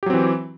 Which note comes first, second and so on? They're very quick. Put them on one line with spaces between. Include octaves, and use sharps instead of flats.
G4 F#3 C4 E3